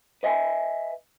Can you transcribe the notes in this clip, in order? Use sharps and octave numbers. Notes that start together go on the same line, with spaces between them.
B4 D#5 E5 G#5